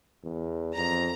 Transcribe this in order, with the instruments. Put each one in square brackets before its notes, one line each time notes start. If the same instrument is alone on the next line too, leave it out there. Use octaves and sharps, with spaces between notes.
[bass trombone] E2
[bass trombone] F2 [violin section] A#5